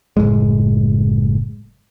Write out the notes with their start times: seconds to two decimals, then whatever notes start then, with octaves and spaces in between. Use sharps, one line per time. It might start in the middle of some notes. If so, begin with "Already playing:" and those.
0.17 F#1 F#2 A2 G#3